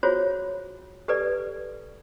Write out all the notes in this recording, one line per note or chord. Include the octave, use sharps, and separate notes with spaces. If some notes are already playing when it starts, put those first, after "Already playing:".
F4 F#4 G#4 C5 C#5
G4 A4 B4 D5